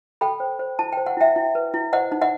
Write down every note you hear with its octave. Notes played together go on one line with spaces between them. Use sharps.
A4 G5 B5
C5
C5
E4 A5
C5 G5
F#5
E4 E5 G5
E4
B4
E4
C5 D#5 F#5
D#4
D#5 F#5